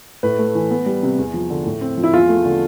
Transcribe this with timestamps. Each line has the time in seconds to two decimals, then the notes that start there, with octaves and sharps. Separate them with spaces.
0.23 A2 B4
0.39 A3
0.55 E3
0.71 B3
0.86 G3
1.03 C3
1.19 E2
1.34 F3
1.50 D3
1.65 A2
1.81 C4
1.97 F3
2.03 E4
2.13 E2 F4
2.29 A3
2.45 D3